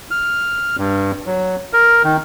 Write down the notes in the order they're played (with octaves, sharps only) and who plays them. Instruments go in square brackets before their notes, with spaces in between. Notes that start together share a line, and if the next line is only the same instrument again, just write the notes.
[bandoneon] F6
G2
F#3
A#4
D#3